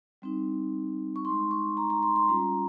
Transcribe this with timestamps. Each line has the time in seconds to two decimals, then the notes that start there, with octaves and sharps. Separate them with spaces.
0.22 G3 C4 D#4
1.16 C#6
1.25 D#4 C6
1.29 G#3
1.51 C#6
1.77 A#5
1.90 A#5
2.03 C6
2.16 C6
2.29 G3 C#4 F4 A#5